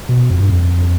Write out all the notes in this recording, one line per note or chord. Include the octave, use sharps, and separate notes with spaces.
B2
F2
G2
F2